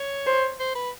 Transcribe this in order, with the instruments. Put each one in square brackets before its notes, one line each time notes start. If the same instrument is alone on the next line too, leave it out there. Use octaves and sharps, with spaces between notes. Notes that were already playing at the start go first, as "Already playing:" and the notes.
Already playing: [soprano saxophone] C#5
[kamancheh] C5
[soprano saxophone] C5
B4